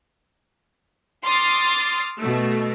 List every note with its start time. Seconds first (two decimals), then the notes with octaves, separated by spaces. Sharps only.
1.25 C6 D6 D#6 F6 A6 C7
2.19 B2 A3